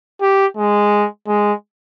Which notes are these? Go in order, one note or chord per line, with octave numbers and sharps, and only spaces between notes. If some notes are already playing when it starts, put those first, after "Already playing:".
G4
G#3
G#3